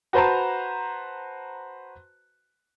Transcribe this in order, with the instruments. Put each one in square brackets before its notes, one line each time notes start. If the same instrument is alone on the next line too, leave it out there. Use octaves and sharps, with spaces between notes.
[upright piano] F#4 B4 C5 A5 A#5